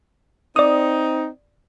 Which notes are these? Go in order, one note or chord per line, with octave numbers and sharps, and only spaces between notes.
C4 D#4 D5 D#6